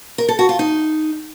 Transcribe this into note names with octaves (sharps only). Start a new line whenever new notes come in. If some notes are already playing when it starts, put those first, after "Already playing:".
A#4
A4
F#4
F4
D#4